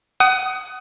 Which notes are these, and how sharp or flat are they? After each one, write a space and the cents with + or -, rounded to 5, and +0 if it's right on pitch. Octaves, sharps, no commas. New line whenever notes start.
F#5 +30 D#6 +5